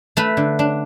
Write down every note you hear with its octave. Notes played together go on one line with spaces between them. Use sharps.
A3 B4
D3
D4